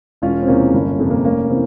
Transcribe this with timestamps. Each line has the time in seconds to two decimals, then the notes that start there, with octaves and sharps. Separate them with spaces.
0.22 E1 C#4 F4
0.42 C4
0.47 E2 C3 A#3 C#4
0.73 G1
0.99 F2 C3
1.10 A#3
1.18 C4
1.24 F1 A#3 C#4
1.49 C3 E3 C4